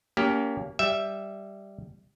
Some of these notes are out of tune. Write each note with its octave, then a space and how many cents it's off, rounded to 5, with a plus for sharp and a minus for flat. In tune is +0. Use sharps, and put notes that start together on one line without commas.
A#3 +0 C#4 +30 G4 +0
G3 +0 E5 +0